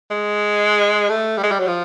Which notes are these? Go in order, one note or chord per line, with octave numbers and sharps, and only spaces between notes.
G#3
A3
G3
G#3
G3
F#3
F3